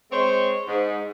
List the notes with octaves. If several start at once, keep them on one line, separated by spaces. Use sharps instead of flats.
G#3 C4 C5 C#5
G#2